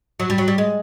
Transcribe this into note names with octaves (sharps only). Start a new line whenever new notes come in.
F#3
G3
F#3
G3
G#3